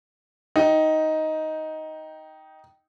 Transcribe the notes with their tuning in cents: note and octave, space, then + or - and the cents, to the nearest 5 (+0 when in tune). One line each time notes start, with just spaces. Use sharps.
D#4 +10 G5 -10